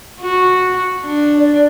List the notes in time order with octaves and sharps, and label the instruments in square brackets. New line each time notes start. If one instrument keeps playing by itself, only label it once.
[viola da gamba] F#4
D4
[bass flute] D5